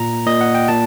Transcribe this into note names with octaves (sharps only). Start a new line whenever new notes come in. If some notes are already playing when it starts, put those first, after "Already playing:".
Already playing: A#2 A#5
A#2 D#5
F#5
G5
A#2 A5